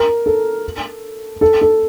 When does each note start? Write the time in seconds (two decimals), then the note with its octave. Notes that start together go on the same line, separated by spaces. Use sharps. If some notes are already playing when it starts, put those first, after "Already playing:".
Already playing: A#4
0.26 A4
1.41 A4
1.61 A4